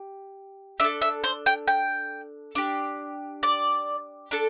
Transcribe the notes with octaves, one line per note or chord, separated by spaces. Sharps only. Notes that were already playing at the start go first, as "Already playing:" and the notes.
Already playing: G4
D4 A4 E5
E5
C5
G5
G5
D4 G4
D5
D4 A4